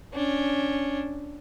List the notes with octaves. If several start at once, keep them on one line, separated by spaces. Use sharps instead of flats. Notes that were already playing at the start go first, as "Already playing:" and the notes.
C#4 D4